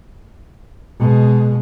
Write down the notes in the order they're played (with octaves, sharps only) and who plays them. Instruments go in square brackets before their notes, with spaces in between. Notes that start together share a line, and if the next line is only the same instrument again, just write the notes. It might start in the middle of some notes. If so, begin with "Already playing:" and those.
[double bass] B2 G#3